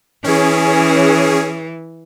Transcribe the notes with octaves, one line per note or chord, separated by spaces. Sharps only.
E3 C#4 G#4